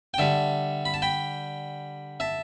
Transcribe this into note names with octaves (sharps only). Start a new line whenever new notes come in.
G5
D3 G3 E5 A5
B5
A5
G5 B5
E5 A5